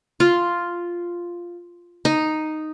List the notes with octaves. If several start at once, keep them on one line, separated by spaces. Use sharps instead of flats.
F4
D#4